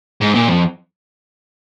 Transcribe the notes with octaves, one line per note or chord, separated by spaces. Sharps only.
G#2
A#2
F2